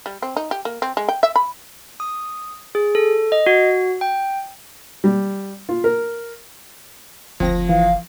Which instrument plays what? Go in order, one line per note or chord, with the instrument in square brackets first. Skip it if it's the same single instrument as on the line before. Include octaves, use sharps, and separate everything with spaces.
[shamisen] G3
C4
D#4
G4
A#3
C4
G#3
G5
E5
B5
[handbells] D#6
G#4
A4
D#5
F#4
G5
[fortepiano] G3
F4
A#4
[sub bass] F#1 [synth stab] D2 C4 A#6 [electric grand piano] F3
[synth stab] E3 [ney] F5